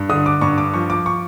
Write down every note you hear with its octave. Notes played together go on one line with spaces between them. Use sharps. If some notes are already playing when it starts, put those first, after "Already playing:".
Already playing: G2
D3 D#6
D6
G2 C#6
D6
F3 C#6
D6
C#6